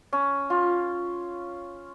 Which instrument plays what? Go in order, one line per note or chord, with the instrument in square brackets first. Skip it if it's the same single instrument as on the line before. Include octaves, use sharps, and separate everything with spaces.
[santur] C#4
F4